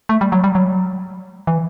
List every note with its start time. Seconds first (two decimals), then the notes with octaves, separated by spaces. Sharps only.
0.09 A3
0.21 G3
0.32 F#3
0.44 G3
0.55 F#3
1.47 E3